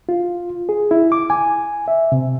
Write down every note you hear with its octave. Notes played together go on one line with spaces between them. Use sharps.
F4
G#4
E4
D6
G#5
E5
C3